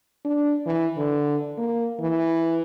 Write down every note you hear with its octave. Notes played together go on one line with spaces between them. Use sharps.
D4
E3
D3
A#3
E3